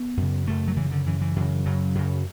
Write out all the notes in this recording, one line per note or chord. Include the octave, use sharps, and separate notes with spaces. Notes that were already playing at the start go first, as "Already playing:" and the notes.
Already playing: B3
F#2 C#3
F#2 C#3 A3
F#3
F#2 C#3 E3
D3
F#2 C#3 E3
E3
F#2 C#3
F#2 C#3 F#3
F#2 C#3